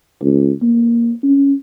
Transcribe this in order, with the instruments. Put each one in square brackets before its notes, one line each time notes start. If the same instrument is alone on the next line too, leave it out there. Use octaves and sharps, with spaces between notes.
[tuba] C#2
A#3
C#4